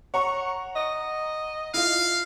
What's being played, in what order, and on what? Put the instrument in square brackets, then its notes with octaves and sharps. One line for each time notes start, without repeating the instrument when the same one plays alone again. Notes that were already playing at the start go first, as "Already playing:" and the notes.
[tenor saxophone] C#5 [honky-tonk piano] F#5 A#5 C#6
[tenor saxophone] D#5
[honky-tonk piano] E4 F4 [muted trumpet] F5